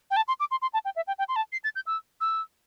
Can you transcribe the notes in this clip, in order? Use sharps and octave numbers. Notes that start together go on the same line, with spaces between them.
G5
A5
C6
D6
C6
C6
A5
G5
E5
G5
G5
C6
A5
C7
A6
G6
E6
E6